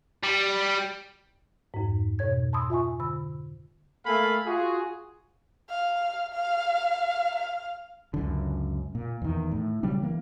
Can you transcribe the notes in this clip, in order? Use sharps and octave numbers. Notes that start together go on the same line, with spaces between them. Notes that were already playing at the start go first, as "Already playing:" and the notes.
G3
F2 G#2
F2 B2 C#5 G#6
A5 B5 C6 D#6 E6
F4 E5 G#5 C#6
D3 B5 E6
A3 A#3 A4 F5 G#5 B5
F4 F#4 G#4
F5
F5
F5
C#2 F#2 D3
A#2
E2 D#3
A2
C#3 F#3 G3 D4
E3 A#3